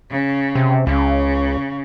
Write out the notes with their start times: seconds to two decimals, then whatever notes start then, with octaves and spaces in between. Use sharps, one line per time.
0.10 C#3
0.55 C3
0.87 C#2 C#3